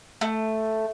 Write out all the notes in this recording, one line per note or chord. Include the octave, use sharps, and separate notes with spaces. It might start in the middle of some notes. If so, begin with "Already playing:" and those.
A3